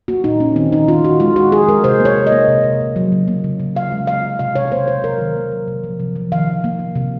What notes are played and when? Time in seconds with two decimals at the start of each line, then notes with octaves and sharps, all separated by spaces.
0.08 A#3 F#4
0.24 A#2 D#4
0.40 A#3 C#4
0.56 D#3 C4
0.72 D#3 D#4
0.88 D#3 F4
1.04 D#3 F#4
1.20 G#3 F4
1.36 G#3 F#4
1.52 G#3 G#4
1.68 G#3 A#4
1.84 C3 C5
2.00 A#3
2.05 C#5
2.16 C3
2.27 D#5
2.32 A#3
2.48 C3
2.64 C3
2.81 C3
2.96 F#3
3.12 C#3
3.28 A#3
3.44 C#3
3.60 C#3
3.76 C#3 F5
3.92 G#3
4.07 G#3 F5
4.24 G#3
4.39 C3 F5
4.55 C3 C#5
4.72 A#3 C5
4.88 C3 C5
5.04 F#3 A#4
5.20 D#3
5.36 A#3
5.52 F#3
5.68 C3
5.84 F3
6.00 C3
6.16 F3
6.32 D#3 F5
6.47 D#3
6.64 A#3
6.79 A#3
6.95 C3